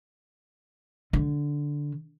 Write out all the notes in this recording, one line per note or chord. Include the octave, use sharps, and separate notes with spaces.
D3